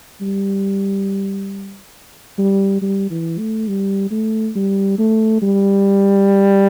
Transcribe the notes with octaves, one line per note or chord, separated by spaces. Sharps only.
G3
G3
G3
E3
A3
G3
A3
G3
A3
G3